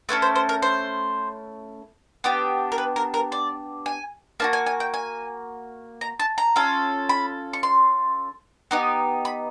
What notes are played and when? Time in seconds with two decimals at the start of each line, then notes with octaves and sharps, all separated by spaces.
0.09 A3 C#4 E4 A4 B4
0.22 C5
0.36 C5
0.49 A#4
0.62 C5
2.24 B3 D4 G4
2.72 A#4
2.78 B4
2.96 A#4
3.14 A#4
3.32 D5
3.86 G#5
4.40 A#3 D4 F#4 A5
4.53 G#5
4.66 G#5
4.80 G5
4.94 G#5
6.01 A#5
6.19 A5
6.38 A#5
6.56 C#4 F4 A4
7.09 B5
7.53 C#6
7.63 C6
8.71 B3 D#4 G4
9.25 B5